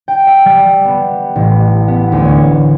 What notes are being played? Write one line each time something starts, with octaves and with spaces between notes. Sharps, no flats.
G5
E5
G3
B3
A1
B3
D2
C#5